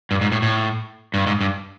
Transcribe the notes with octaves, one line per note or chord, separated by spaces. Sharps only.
G2
G#2
A2
A2
G2
G#2
G2